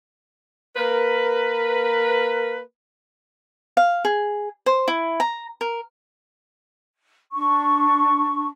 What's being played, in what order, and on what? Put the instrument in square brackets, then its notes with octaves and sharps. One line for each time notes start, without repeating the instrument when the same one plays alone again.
[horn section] A#3 A#4 B4
[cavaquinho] F5
G#4
C5
E4
A#5
A#4
[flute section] D4 C#6